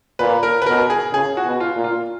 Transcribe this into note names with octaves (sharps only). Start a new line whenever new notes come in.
A#2 B4
A#4
B4
B2 A#4
G#4
C#3 G#4
F#4
B2
F4
A#2
F4